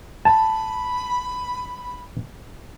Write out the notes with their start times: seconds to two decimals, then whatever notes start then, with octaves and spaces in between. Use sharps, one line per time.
0.25 A5 B5